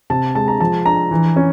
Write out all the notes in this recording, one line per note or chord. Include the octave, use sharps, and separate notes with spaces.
C3 A5
G#3 A5
A#5
F3 A5
D4 A#5
E3
C#4